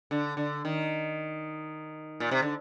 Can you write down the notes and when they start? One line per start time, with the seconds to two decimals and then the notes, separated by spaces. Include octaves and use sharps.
0.11 D3
0.37 D3
0.65 D#3
2.20 A#2
2.31 C3
2.42 D3